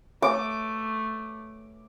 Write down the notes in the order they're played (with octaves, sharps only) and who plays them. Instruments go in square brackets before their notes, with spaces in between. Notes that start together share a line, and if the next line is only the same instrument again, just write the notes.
[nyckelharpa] A3 [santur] D6